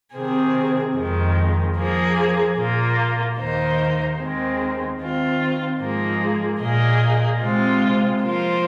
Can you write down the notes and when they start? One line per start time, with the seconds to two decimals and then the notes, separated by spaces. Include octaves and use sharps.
0.15 C3 D#3 C4 G#4
0.95 F2 D#3 G#3
1.76 F3 A#3 G#4
2.57 A#2 A#3 F4
3.38 D#2 D#3 A#3 D#4 C5
4.18 D#2 D#3 G#3 C4
4.99 D#3 C4 F4
5.80 G#2 F3 A#3 G#4
6.61 A#2 A#3 G#4 D#5
7.42 C3 G#3 C4 F4
8.22 F3 A#3 F4 C5